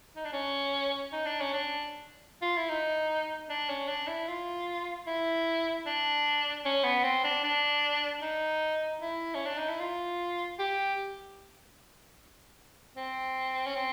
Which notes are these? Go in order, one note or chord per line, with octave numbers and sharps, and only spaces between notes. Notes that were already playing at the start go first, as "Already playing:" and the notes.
D#4
D4
C#4
D#4
D4
C#4
D4
F4
E4
D#4
D4
C#4
D4
E4
F4
E4
D4
C#4
B3
C4
D4
D4
D#4
E4
C#4
D4
D#4
E4
F4
G4
C4
C#4
C4